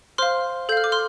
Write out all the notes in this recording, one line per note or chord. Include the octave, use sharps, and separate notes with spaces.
C5 F5 C6 F6
A4 F5 F6 G6
D6
C6 F6